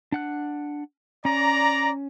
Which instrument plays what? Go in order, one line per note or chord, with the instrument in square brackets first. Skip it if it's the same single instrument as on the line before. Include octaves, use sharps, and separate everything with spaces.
[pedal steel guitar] D4 F#5 F#6
[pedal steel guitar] C#4 [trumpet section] D5 A#5